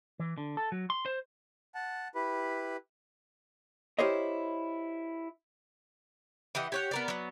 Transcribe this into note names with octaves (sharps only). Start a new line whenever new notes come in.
E3
D3
A4
F#3
C6
C5
F#5 A5
E4 G4 B4 B5
E4 G4 A#4 C5 C#5 D#5
E3 G4 D#5 F#5
G4 C#5 F#5
B3 A#4 D5
F#3 B3